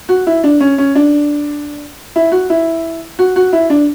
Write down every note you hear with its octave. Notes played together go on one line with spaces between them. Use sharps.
F#4
E4
D4
C#4
C#4
D4
E4
F#4
E4
F#4
F#4
E4
D4